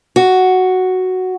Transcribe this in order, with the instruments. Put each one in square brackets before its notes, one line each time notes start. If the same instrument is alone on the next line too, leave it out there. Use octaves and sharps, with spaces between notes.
[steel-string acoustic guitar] F#4